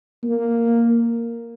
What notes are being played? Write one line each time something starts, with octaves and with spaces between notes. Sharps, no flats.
A#3